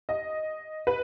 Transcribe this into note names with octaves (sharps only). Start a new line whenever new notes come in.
D#5
B4